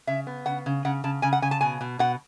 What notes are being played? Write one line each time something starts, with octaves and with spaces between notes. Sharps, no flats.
C#3 E5
B3
C#3 F#5
C#3
C#3 F#5
C#3 A5
C#3 G#5
F#5
C#3 G#5
A5
B2 G#5
B2
B2 F#5